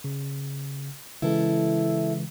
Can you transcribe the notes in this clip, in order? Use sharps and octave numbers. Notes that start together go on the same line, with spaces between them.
C#3
C#3 E3 G#3 E4 A4